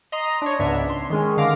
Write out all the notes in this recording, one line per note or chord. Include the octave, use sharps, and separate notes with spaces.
D#5 A#5 C6 D#6
D4 C#5
C#2 G#2 B3 D4 E5
C6
D#3 G#3 C#4
D3 D#3 F5 D6 A#6